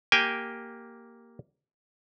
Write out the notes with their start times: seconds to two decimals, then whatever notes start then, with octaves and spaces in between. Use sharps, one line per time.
0.12 A#3 G4 G5 G#5